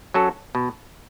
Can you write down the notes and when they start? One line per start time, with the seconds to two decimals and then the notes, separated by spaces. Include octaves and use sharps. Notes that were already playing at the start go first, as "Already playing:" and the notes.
0.14 F#3 C#4 F#4 A4
0.55 B2